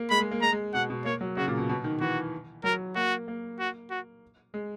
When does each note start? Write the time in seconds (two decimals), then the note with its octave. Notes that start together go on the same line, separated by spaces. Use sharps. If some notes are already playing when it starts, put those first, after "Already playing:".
Already playing: A#3
0.10 G#3 B5
0.20 G#3
0.31 A#3
0.42 G#3 A#5
0.52 G#3
0.74 B2 F#5
0.90 B2
1.05 A#3 C#5
1.21 F#3
1.37 C#3 F#4
1.48 A#2
1.58 B2
1.69 B2
1.84 D#3
2.00 E3 F#4
2.64 F#3 A#4
2.95 A#3 F#4
3.28 A#3
3.60 F#4
3.90 F#4
4.54 G#3